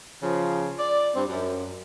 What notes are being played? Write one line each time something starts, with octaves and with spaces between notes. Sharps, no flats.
C#3 F3
D5
G2 C4
F#2